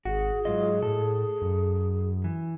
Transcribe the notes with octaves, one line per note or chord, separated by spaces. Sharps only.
G#1 F#4 G#4
G#2 F#3 F4 D#5
A2 A4
F#2
E3